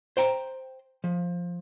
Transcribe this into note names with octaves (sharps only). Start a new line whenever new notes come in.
C5 G5 A#5
F3